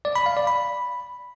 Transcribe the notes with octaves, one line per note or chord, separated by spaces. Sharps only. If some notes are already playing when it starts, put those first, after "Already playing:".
D5
B5
F5
D5
B5